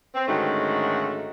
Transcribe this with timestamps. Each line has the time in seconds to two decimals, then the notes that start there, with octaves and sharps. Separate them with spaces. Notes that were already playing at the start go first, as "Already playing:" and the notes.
0.15 C4
0.27 G#2 D3 D#3 A3 C#4 F#4